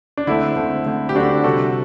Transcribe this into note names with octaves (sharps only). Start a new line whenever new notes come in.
D4
D3 A3 C4 E4
D3 A3 C4
D3 A3 C4
G4
D3 A3 C4 D4 F#4
C3 G3 C4 F#4 A4